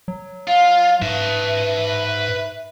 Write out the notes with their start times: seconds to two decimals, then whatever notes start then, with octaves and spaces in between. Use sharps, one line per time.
0.08 F#3
0.48 F4 F5
1.02 G#2 B4 E5 A5